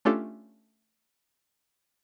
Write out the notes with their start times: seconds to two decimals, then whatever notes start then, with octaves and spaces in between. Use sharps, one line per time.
0.05 A3 C#4 D4 F4 G4 A4